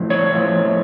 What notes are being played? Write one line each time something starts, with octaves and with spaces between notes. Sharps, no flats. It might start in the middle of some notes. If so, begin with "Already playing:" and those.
Already playing: A2 F3
C#5
A2 F3